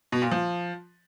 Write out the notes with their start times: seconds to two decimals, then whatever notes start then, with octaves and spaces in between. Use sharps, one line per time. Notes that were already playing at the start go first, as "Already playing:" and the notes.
0.12 B2
0.22 A#2
0.32 F3